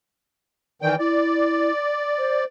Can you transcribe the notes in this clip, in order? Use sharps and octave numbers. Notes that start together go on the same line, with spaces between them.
D#3 E3 D5 G5
E4 D5
C5